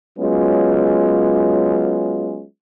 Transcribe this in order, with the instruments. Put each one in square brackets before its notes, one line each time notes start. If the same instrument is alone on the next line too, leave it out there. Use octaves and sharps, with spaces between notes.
[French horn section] F#3 G#3 B3 C#4 F4